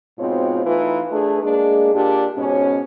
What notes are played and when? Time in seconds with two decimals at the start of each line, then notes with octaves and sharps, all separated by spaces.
0.19 G#2 B2 C4 F4 C#5
0.65 E3 A3 D#4 F4 B4
1.12 A3 D4 G#4 B4
1.43 G#3 A#3 D4 G#4
1.94 A#2 D4 G4
2.37 G#2 B2 C#4